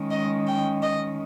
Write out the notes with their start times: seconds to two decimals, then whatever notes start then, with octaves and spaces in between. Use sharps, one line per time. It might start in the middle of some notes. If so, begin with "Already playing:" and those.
Already playing: D#3 G#3 C#4
0.11 D#5
0.47 G5
0.82 D#5